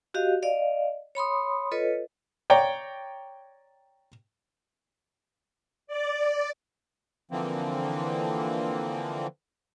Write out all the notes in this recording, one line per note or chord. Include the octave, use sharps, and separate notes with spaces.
F#4 G4 D#5 F5
D5 D#5 F5
C#5 B5 C6 D#6
F4 A4 B4 C#5 D#5
C#5 D5 G5 A#5
D5
D3 E3 F3 A#3 C4